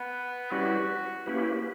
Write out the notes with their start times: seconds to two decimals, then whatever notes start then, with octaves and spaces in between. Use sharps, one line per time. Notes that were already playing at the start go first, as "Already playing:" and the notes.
Already playing: B3
0.51 G3 C#4 E4 F#4 G4 B4
1.26 A#3 C#4 E4 G4 B4